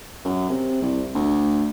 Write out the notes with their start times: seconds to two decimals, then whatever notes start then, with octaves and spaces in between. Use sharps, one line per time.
0.24 F#2
0.49 C3
0.82 C2
1.15 D2